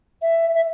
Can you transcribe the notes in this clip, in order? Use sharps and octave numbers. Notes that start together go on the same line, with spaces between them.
E5
E5